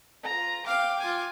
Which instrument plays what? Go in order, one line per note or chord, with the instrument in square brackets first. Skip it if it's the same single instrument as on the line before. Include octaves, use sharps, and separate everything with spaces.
[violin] F4 A#5
[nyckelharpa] F5 [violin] G5 D6
[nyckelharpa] F4 G#5